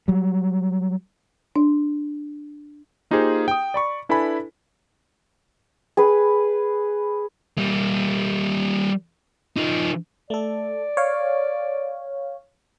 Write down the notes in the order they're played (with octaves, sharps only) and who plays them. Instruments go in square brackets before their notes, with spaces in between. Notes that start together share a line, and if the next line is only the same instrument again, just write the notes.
[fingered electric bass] F#3 G3
[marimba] D4
[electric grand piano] A#3 D#4 F4 G4 G#4 C5
G5 D#6
D5 B5 C#6
D4 E4 A4 B4 G#5 B5
[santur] G#4 B4
[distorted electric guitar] G3 A#3
F3 D#4
[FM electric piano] A3 A4 [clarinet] D5
[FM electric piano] C#5 F5